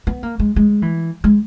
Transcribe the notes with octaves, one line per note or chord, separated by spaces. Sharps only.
B3
A#3
G#3
G#3
E3
G#3